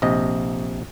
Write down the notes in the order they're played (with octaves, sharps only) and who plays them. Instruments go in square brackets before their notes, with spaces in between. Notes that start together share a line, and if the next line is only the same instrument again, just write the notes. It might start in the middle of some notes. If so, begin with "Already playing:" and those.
[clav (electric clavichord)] A#1 C3 D#5